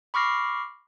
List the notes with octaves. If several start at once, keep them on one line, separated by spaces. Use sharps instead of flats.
B5 C#6 D6 F6 A#6 C7